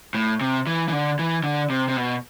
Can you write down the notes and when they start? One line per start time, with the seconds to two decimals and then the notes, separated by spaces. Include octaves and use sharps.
0.14 A2
0.41 C3
0.67 E3
0.88 E3
0.92 D3
1.19 E3
1.44 D3
1.70 C3
1.88 C3
1.96 B2